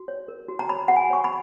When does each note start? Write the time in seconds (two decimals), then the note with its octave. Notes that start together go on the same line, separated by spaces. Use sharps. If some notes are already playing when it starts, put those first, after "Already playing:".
Already playing: F#4
0.08 C#5
0.28 A#4
0.48 F#4
0.59 A#5
0.69 C#5 B5
0.88 F#4 F#5
0.96 G#5
1.10 C#5 C#6
1.24 B5